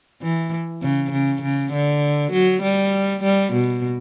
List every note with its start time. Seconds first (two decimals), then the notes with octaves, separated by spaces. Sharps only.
0.22 E3
0.82 C#3
1.12 C#3
1.42 C#3
1.73 D3
2.33 F#3
2.63 G3
3.24 G3
3.54 B2